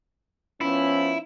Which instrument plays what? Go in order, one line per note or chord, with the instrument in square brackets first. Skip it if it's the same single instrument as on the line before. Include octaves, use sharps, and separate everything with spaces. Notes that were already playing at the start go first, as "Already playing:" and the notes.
[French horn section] F3 B3 C#4 [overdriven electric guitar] E4